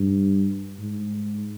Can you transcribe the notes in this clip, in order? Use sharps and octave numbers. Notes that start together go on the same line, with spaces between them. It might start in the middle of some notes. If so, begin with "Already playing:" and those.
Already playing: G2
G#2